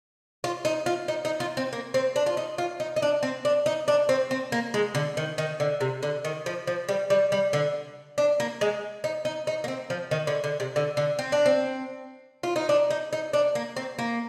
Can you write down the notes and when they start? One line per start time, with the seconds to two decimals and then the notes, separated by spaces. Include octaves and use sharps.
0.44 F4
0.65 D#4
0.86 F4
1.08 D#4
1.25 D#4
1.40 F4
1.57 C4
1.73 A#3
1.94 C4
2.16 D4
2.26 F4
2.37 D#4
2.58 F4
2.80 D#4
2.96 D#4
3.02 D4
3.23 C4
3.45 D4
3.66 D#4
3.88 D4
4.09 C4
4.31 C4
4.52 A#3
4.74 G#3
4.95 D3
5.17 D#3
5.38 D#3
5.60 D3
5.81 C3
6.03 D3
6.24 D#3
6.46 F3
6.67 F3
6.89 G3
7.10 G3
7.32 G3
7.53 D3
8.18 D4
8.40 A#3
8.61 G#3
9.04 D#4
9.25 D#4
9.47 D#4
9.64 A#3
9.68 C4
9.90 F3
10.11 D#3
10.27 D3
10.44 D3
10.60 C3
10.76 D3
10.97 D3
11.19 C4
11.32 D4
11.46 C4
12.43 F4
12.56 D#4
12.69 D4
12.90 D#4
13.13 D#4
13.33 D4
13.55 A#3
13.76 C4
13.99 A#3